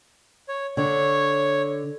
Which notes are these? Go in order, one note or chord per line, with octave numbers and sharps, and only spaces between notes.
C#5
D3 C#5